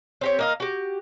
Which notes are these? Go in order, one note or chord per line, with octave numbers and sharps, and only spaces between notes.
C4 G4 C#5
A#3 D#5 F5
F#4 G4